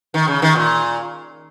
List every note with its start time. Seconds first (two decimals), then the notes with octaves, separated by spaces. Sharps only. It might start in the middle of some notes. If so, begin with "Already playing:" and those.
0.14 D#3
0.28 C#3
0.42 D#3
0.55 A#2